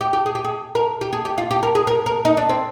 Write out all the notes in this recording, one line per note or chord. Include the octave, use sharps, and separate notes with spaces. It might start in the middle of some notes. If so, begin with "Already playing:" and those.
G4
G4
G#4
G4
G#4
A#4
G4
G#4
G4
F4
G4
A#4
G#4
A#4
A#4
D#4
D4
C4